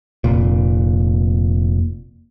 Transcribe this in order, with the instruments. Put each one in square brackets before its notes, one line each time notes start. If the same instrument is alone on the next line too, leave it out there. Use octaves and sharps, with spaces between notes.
[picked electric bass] F1 A#2